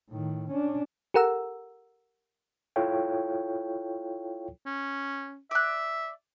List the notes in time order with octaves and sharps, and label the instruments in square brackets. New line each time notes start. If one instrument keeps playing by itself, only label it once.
[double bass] A2 D#3
C#4 D4
[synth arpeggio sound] G4 A4 A#4 F#5 A#5 E6
[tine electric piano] E4 F4 A4 C#5 F5 G5
[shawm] C#4
[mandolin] D5 F#6 [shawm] E5